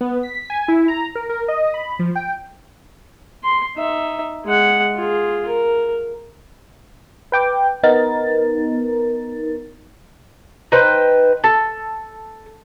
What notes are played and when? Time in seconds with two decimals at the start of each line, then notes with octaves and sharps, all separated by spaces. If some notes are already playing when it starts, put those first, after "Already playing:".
0.01 B3
0.23 B6
0.50 G#5
0.68 E4
0.88 A#5
1.15 A#4
1.29 A#4
1.48 D#5
1.74 B5
1.99 F3
2.15 G5
3.43 C6
3.77 D#4 E5
4.45 G#3 F#5
4.96 F4 G#4
5.48 A#4
7.32 B4 G5 D6
7.83 B3 D#4 A#4 A6
10.72 D#4 B4 C5 G5
11.44 A4